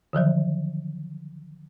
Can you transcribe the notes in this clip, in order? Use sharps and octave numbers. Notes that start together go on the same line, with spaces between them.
D3 D#3 F3 F#3